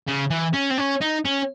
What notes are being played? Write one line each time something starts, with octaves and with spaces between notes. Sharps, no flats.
C#3
E3
C#4
C4
C#4
D#4
C#4